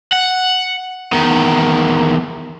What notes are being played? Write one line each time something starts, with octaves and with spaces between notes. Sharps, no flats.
F#5
E2 D#3